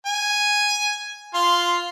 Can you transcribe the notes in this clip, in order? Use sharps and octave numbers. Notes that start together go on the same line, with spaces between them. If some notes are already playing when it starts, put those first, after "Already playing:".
G#5
F4 C6